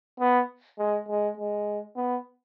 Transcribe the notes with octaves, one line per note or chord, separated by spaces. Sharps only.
B3
G#3
G#3
G#3
B3